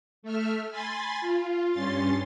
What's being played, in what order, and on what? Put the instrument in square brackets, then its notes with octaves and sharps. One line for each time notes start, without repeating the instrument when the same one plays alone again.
[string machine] A3 E5 F6
G#5 B5 C6 A6
F4
G2 C#4 C6 A6